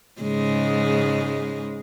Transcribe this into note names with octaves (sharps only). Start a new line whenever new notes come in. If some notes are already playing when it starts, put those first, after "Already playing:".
G#2 C#3 G#3